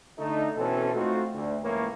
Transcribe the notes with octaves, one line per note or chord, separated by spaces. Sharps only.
D3 A3 D#4
B2 E3 C4 C#4 A4
A3 C4 D#4 F4 F#4
D2
C#2 A2 E3 A#3 A#4 C#5